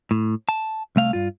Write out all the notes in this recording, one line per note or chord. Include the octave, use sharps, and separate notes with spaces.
A2
A5
C2 A3 F5
G2 F4